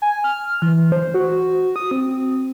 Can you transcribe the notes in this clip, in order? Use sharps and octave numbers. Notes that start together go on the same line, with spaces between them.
G#5
F6
E3
C5
F#4
D#6
C4